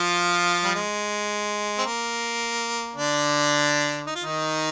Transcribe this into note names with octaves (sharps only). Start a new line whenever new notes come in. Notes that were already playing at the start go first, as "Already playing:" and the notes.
Already playing: F3 F4
G3
G#3
C4
A#3
D3 D4
D#4
F4
D#3 D#4